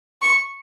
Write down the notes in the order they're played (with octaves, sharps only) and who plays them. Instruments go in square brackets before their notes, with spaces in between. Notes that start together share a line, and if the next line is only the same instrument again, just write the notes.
[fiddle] C#6